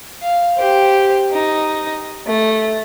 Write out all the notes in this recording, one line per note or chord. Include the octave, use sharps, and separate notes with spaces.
F5
G4 C5
D#4
A3